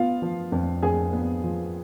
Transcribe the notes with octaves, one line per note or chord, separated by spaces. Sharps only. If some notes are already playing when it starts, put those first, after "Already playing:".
Already playing: B3 F4 F5
F3
F2
F2 G#4 G#5
B3
F3